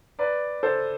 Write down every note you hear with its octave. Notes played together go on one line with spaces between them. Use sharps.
B4 D5
A4 C5